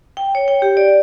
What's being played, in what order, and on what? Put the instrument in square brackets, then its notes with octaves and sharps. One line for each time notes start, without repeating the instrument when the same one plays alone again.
[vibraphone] G5
C#5
G5
G4
D5